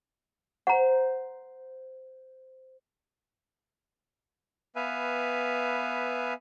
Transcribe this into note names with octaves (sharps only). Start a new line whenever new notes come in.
C5 F#5 A#5 G6
B3 B4 E5 F5 G#5